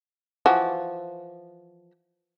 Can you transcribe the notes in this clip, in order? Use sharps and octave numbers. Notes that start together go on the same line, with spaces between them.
E3 F3 F#4